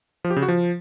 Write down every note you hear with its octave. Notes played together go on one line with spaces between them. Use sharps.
F3
G4
C#3
F#4
F3